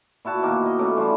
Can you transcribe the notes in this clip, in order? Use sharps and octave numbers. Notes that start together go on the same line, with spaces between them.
A#2 E4 F#4 A5
B2 D#3 A#3
D#5
A3 B3 C#4 D6
E3 G3 F4 A5